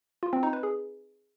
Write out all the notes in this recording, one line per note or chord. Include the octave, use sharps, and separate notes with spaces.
F4
C4
D#4
B4
G#4